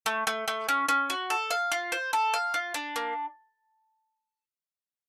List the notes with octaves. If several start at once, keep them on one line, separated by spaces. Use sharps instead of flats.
A3
A3
A3
C#4
C#4
F#4
A4
F5
F4
C5
A4
F5
F4
D4
A#3